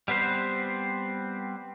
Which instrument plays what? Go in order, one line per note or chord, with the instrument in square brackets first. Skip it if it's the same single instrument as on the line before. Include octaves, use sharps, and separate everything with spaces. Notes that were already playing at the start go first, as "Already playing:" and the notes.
[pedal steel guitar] G3 B3 C4 B4 C5